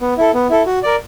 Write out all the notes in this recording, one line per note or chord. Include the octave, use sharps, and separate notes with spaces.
B3
E4 A4
B3
E4 A4
F#4
A#4 D5